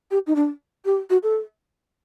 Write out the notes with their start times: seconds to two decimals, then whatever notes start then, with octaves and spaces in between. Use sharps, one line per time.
0.11 G4
0.27 D#4
0.36 D4
0.85 G4
1.10 F#4
1.23 A4